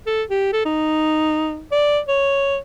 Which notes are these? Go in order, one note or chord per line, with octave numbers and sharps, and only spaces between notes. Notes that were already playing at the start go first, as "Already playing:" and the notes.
A4
G4
A4
D#4
D5
C#5